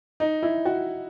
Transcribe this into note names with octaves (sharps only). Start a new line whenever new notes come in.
D#4
E4
F#4